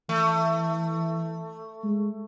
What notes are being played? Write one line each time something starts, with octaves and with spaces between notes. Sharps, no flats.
E3 A3
G#3